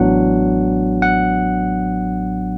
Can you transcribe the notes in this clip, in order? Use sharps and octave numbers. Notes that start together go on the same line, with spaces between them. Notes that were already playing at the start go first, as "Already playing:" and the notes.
Already playing: A1 A2 F#3 B3 D4 F#5
F#5